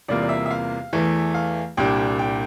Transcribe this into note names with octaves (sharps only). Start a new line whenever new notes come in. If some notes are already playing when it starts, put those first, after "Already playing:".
E2 C3 G3 A#3 F4 D5
D5
E5
E5
F5
E2 E3 A3
F5
C2 A#2 G3 D4 G5
G5